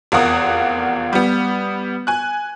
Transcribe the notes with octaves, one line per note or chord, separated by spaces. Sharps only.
F1 E2 F4 A#4 F#5 D#6
G3 B3
G#5 F#6